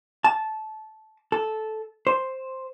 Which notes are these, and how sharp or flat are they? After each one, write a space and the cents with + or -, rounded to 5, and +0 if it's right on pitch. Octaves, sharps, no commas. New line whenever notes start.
A5 -15
A4 -10
C5 +5